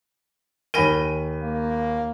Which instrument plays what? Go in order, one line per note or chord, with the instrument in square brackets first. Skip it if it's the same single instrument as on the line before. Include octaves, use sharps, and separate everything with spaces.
[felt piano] D#2 B5 D#7 [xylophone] A#4 G#5 A#6
[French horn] A#3